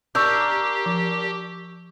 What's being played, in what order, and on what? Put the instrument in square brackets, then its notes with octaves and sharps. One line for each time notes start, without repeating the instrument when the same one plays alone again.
[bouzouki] D4 A#4 [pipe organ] G4 [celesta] C#6 E6 G6
[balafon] F3